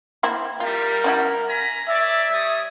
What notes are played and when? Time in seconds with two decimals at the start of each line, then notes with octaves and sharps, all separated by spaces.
0.23 A#3 C4 E4
0.60 G3 F4 A#4
1.04 C#4 E4 F#4
1.47 G#5 A#5 B5
1.88 C#5 D5 E5
2.31 G3 C#5 D#6